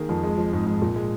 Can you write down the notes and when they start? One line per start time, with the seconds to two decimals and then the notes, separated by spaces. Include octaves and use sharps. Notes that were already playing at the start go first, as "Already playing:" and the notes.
Already playing: D#3 A#3 G#4
0.09 F2
0.23 G#3
0.38 F3
0.53 G#2
0.66 G#2
0.82 A#2
0.96 G#3